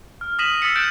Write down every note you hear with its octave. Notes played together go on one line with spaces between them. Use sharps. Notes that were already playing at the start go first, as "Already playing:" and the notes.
F6
D#6 A#6 B6 D#7 E7 F#7
D#6 E6 A6 B6 C#7
F#6 G6 A6 D7 E7